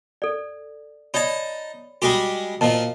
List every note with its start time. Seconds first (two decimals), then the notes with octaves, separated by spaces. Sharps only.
0.22 A4 D5
1.14 D#4 C#5 D5 A5 B5
2.02 G3 G#3 F#4 G4
2.61 A#2 F3 D#5 A5